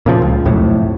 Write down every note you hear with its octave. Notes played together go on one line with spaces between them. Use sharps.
A#2 C#3 F3
C#2
B1 F2 A2